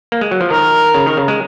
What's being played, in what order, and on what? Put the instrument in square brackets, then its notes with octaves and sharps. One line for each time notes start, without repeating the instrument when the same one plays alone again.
[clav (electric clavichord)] A#3
G#3
F#3
F3
[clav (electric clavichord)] D#3 [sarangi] A#4
[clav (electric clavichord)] C#3
D#3
C#3
G#3